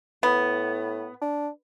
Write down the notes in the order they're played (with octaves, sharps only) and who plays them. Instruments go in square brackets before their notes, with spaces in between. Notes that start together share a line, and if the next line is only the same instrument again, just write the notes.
[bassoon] A2 [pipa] B3
[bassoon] D4